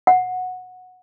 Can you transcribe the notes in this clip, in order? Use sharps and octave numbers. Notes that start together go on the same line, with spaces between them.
F#5